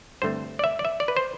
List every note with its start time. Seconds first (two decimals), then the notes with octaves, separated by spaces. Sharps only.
0.22 G2 D3 A3 C4 C5
0.59 D5
0.64 E5
0.79 D5
0.85 E5
1.00 D5
1.08 B4
1.17 C5